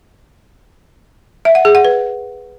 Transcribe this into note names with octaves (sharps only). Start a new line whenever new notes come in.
E5
F#5
G#4
F#5
B4